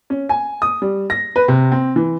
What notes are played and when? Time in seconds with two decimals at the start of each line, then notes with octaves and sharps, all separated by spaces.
0.10 C#4
0.29 G#5
0.62 D#6
0.82 G3
1.10 A#6
1.36 B4
1.48 C3
1.72 C4
1.96 E3